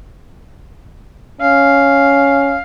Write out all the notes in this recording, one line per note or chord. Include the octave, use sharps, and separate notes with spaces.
C#4 F5